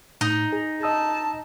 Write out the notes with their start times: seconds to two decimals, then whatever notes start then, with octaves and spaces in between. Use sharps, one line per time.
0.21 A2 D#4
0.53 G#4
0.83 D#5 A5 D#6 E6